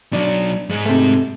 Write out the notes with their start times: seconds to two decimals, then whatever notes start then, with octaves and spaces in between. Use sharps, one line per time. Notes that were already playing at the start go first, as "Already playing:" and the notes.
0.13 B2 F#3 D4
0.69 G#2 G#3
0.86 C3 A3